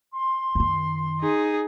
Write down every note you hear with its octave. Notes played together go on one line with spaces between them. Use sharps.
C6
F#2 D#3
D#4 G#4